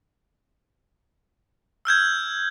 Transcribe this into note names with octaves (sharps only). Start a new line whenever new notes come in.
E6 F6 G6 G#6